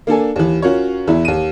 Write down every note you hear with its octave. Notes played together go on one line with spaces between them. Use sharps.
A#3 D4 A4 G#5
D#2 E3
C#4 F4 F#4 A#4 C#5
E2 E3 E4
D#2 D#7